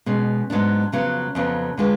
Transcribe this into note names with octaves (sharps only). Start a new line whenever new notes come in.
B2 G#3 C#4
G#2 F#3 B3 D4
F2 C#3 F#3 B3
F2 C#3 F#3 B3
D3 G#3 D4 F4 B4